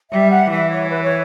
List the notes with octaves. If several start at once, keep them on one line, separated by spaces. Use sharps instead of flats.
G3 E5
F#5
E3 E5
C#5
B4
C#5